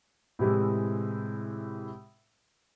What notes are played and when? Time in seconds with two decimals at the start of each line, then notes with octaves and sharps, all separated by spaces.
0.39 A2 C3 E3 G#3